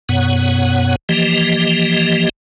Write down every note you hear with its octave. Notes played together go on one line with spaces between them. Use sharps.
F#2 B2 B3 C#5 F#5
E3 F3 A#3 G4 D#5